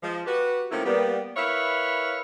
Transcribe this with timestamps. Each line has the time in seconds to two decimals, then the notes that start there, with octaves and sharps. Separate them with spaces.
0.02 F3 G#3
0.26 F#4 G4 B4
0.71 C3 F3 A3 A#3 C#4 E4
0.85 G3 A#3 B3
1.36 E4 A#4 B4 C#5 E5 F5